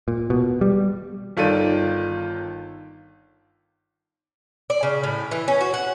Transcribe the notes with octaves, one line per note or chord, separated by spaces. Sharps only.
A#2
B2
G3
G1 D#3 F4 A4 D5 D#7
D5
C#3
A2
E3
C#4
F#4
F#5